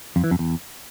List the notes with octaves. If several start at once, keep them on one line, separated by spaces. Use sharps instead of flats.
F2
E3
F2
E2